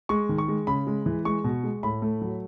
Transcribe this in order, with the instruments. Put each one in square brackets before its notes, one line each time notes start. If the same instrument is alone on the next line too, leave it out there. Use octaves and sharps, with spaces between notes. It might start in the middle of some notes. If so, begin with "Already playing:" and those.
[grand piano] G#3 C#6
D#3
C#6
G#3
C#3 B5
G#3
E3
G#3 C#6
B2
G#3
A2 B5
A3
F#3